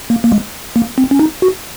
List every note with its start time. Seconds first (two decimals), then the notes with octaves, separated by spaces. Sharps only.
0.10 A#3
0.24 A#3
0.32 G#3
0.76 A#3
0.98 C4
1.11 C#4
1.19 D#4
1.42 F#4